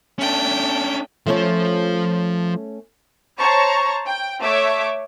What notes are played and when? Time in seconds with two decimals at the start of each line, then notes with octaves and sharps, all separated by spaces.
0.19 A3 C#4 D4 G5
1.27 F3 A3 C#4 F4 C#5
3.39 C5 C#5 A5 A#5 C#6
4.06 G5
4.41 A3 C#5 E5 D6